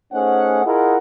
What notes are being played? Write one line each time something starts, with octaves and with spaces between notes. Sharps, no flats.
A3 C#4 D#4 G#4 C5 F#5
E4 F4 G#4 A#4 D#5 F#5